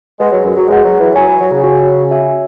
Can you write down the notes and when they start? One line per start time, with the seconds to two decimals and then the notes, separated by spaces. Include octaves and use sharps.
0.20 G#3 G#4 B4 F#5
0.31 F#3
0.44 F#2
0.56 F#3
0.68 G#3 G#4 B4 F#5
0.84 F#3
1.00 E3
1.15 F#3 F#4 C#5 G#5
1.28 E3
1.40 F#3
1.51 C#3
1.64 F#4 C#5 G#5
2.11 F#4 E5 G#5